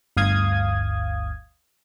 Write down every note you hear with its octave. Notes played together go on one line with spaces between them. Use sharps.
G1 D2 F5 D#6 G#6